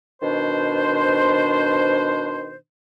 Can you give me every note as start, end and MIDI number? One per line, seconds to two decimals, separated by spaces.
0.22 2.55 47
0.22 2.55 51
0.22 2.55 62
0.22 2.55 72